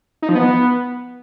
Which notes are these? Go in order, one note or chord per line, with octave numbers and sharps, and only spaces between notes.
D#4
F3
B3